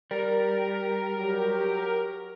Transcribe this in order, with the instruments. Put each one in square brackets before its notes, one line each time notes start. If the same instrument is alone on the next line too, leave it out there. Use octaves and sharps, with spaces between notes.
[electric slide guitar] G3 [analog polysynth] A#4
[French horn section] F#3 G4